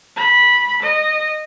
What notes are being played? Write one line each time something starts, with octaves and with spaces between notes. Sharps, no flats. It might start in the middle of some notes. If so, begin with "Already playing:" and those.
B5
D#5